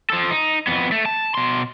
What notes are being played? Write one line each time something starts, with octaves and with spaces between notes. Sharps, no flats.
F3 A4
D#4
F2 B3
A3
A5
B2 C6